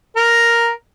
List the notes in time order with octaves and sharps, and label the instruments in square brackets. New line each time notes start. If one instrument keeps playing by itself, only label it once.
[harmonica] A#4